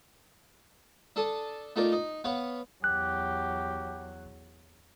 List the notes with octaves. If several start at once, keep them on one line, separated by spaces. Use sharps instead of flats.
D4 A4 A5 D#6
A3 D#4 F4 A#4 D5
D#4
B3 B4 C#5 F5
E2 F#3 G4 F#6